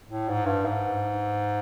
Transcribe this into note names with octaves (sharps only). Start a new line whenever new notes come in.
A2
G#2
G2
G#2